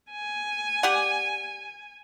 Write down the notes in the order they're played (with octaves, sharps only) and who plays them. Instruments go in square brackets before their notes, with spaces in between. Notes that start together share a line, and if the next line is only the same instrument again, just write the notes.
[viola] G#5
[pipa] G4 D5 F#5